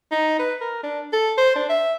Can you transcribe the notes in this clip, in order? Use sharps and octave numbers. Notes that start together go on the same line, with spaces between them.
D#4
B4
A#4
D4
A4
C5
D4
E5